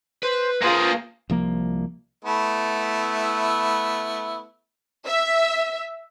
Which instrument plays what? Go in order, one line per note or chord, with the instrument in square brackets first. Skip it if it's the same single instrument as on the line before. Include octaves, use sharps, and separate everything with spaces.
[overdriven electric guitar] B4 [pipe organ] C5
[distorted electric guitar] A#3 G#4 [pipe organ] F4 C5 [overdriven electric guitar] B4 F5
[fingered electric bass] C2 F3 A#3
[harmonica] A3 B3 E4
[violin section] E5